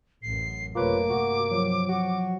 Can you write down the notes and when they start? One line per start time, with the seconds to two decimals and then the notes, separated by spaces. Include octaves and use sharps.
0.22 A1 F#2 C7
0.75 F#1 C3 A3 A#3 F4 B4 C#5 D6
1.10 G2 C3 F#4
1.51 F3 F#3
1.89 F#4